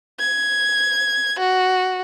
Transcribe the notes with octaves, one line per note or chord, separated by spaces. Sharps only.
G#6
F#4